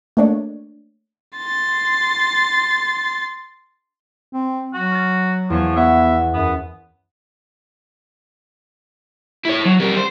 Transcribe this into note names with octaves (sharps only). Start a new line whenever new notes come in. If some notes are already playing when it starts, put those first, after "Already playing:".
A3 A#3 D4 C#5 D5
C6 A6
C4
F#3 F#4
F6 A6
E2 F3 C#5
B3 C#5 E5 F#5
F#2 B3
E4 C#5
F#3
G3 A#4
C5